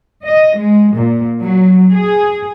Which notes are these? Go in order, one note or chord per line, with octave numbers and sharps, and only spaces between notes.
D#5
G#3
A#2
F#3
G#4